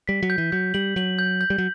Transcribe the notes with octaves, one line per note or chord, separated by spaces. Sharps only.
G3 B6
F#3
G6
E3
F#3 G6
G3 F#7
F#3 F#7
G6
G6
G3
F#3